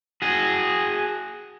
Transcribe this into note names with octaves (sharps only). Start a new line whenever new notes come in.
F#4 G#4